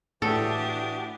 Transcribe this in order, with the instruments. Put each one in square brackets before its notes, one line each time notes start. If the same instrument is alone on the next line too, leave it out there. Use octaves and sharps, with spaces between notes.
[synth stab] A2 [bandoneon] E3 F#4 D#6 [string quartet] D4 G4 [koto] A4